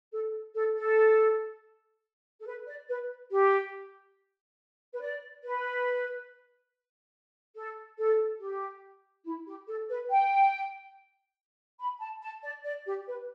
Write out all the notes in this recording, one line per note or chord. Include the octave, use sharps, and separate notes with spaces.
A4
A4
A4
A4
B4
D5
B4
G4
B4
D5
B4
A4
A4
G4
E4
G4
A4
B4
G5
B5
A5
A5
D5
D5
G4
B4